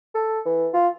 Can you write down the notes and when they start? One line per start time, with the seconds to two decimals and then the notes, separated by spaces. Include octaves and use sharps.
0.15 A4
0.46 E3
0.74 F4